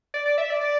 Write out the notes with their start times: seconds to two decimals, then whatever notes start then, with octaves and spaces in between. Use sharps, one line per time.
0.14 D5
0.26 D5
0.38 E5
0.50 D5
0.61 D5